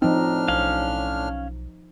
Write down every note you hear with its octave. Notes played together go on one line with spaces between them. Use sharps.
A2 F3 C4 D4 D#4 F6
B1 C#4 F5